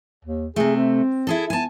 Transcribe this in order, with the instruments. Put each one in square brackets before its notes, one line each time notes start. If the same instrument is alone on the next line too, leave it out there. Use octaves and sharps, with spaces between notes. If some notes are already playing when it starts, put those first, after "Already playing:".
[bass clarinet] D#2
[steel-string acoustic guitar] C3 A3 [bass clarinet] G#4
[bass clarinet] C4
[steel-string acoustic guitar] E4 G#4 A4
[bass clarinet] B3 [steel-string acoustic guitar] G#5 A5